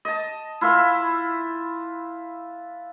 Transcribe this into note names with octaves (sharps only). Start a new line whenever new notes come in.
D#5 A5
E4 F4 B4 E5